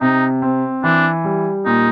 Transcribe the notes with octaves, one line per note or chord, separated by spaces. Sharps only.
C3 D#4
C4
E3 D4
G3
A#2 D#4